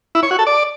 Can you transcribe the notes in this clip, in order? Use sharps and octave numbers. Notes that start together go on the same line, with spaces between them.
E4
C#5
F#4
A4
D5